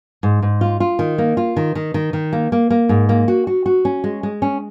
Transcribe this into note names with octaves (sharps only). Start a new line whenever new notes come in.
G#2
G#2
F4
F4
D#3
A#3
F4
D#3
D#3
D#3
D#3
A#3
A#3
A#3
G#2
A#3
F#4
F#4
F#4
C#4
G#3
G#3
C#4